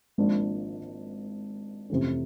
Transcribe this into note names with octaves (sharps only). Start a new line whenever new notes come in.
G#1 G#2 F3 A#3 D4
F2 C3 E3 A3 C#4